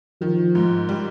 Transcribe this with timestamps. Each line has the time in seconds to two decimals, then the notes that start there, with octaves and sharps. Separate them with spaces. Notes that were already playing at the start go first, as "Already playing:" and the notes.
0.21 D#3 F3
0.55 G#2
0.89 G3